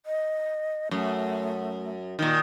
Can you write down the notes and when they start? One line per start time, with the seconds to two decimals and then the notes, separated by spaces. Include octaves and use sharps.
0.06 D#5
0.91 F#2 A3
2.19 A#2 D#3